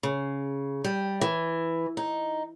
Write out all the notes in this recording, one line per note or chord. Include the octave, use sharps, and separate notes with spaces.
C#3
G3
E3
D#4